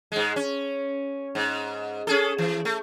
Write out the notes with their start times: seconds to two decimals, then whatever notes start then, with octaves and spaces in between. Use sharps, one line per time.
0.12 G#2 G#3
0.36 C#4
1.35 G#2
2.07 C#4 G#4 A4
2.38 E3
2.65 A3